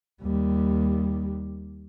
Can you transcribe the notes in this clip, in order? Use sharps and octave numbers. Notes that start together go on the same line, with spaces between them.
D#2 G3